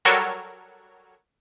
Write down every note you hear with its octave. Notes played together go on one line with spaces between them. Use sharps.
F#3 G3 F#4 A4 A#4 C#5